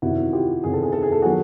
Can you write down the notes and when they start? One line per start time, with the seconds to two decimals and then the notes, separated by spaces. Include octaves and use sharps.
0.02 E2 C3 D#3 E4 F#4
0.33 F4 G4
0.63 E2 C3 D#3 G#4
0.73 A4
0.83 G#4
0.92 A4
1.02 G#4
1.12 A4
1.22 D#3 F#3 F#4 G#4